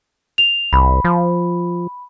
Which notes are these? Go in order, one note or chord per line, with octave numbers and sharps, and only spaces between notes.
F7
C2 B5
F3